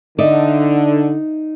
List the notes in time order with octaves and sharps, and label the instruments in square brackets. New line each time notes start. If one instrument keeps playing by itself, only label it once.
[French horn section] D3 [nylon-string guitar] D#4 D5 E5